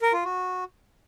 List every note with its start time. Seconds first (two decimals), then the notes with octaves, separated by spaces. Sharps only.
0.02 A#4
0.13 F4
0.24 F#4